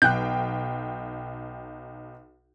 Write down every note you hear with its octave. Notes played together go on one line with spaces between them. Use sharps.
B1 G5 F#6 G6